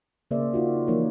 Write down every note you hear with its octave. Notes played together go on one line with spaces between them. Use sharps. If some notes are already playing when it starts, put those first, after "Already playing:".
C#3 A#3 G#4 C5 D5 E5
D#4 F4 F#4
E3 F3 A#3 D#4 A#4 C#5